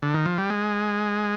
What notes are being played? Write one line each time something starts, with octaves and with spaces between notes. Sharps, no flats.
D3
D#3
F3
G3
G#3